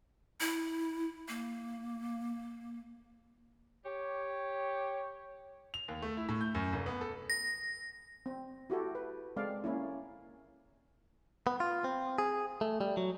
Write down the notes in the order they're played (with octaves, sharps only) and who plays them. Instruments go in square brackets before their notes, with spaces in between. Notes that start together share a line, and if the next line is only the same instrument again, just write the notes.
[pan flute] E4
A#3
[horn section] G4 C#5
[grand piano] F7
D#2
A3
E4
A2
G6
F#2
F1
B3
A4
[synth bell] A#6
[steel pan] C4
E4 F#4 G4 A4
B4
G#3 C4 A4 D5 F5
A#3 C#4 E4
[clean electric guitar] B3
F4
C4
G#4
A3
G3
F#3